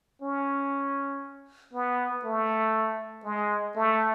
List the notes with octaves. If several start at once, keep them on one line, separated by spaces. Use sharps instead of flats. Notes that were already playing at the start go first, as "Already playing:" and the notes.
C#4
B3
A3
G#3
A3